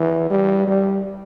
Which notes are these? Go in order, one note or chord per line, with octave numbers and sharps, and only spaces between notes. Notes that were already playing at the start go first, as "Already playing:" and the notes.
Already playing: E3
G3
G3